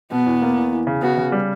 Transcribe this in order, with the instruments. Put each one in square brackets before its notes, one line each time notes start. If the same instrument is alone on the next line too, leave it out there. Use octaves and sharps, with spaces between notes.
[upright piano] B2 [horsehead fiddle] B3
[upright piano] E2
A#3
E2
E3
C#3
[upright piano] B3 [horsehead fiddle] F#4
[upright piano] C#3
G3